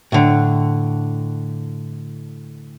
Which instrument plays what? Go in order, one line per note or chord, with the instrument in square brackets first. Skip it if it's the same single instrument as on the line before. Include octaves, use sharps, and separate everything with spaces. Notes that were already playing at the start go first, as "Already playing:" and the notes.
[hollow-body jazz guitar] A2 D3